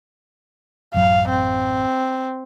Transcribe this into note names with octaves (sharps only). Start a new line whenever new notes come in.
A1 F#2 F#3 F5
C4